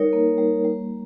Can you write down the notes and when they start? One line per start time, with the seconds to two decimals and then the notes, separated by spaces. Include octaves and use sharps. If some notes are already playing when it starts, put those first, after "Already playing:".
Already playing: G3 D#4 A#4 C#5
0.13 A#3
0.38 G3
0.65 G3